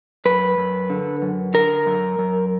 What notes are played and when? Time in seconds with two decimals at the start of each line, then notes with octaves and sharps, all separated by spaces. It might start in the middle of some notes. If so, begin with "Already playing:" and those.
0.25 F#2 B4
0.58 F#2
0.90 D3
1.22 F#2
1.54 D3 A#4
1.86 F#2
2.19 F#2